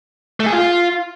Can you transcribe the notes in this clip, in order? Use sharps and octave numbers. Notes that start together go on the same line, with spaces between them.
A3
G#4
F4